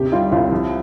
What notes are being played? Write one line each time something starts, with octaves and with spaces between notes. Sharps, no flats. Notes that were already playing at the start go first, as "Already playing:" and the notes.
Already playing: D#2 C3 G4
G3 F4
C2 F4
F3